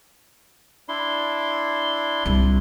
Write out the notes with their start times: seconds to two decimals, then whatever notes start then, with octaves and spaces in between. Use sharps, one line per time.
0.89 D4 E4 C6
2.26 C2 D4